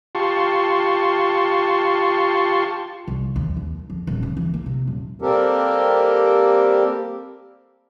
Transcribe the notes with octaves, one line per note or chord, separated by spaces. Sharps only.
F4 G4 A5 C6 C#6
C2
D#2
D#2
F2
D#1
C#3
E3
A#3
C3
D#1
G3 A#3 C4 G4 A4 A#4